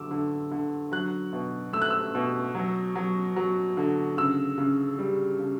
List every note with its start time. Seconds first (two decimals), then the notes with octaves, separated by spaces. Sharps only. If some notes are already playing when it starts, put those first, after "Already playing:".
Already playing: D3 F#3 D6 E6
0.11 D3
0.52 D3
0.92 F#3 F#6
1.33 B2
1.73 A3 E6
1.82 F#6
1.90 E6
2.15 B2
2.55 F#3
2.95 F#3
3.36 F#3
3.77 D3
4.17 C#3 E6
4.58 C#3
4.99 G3
5.40 C#3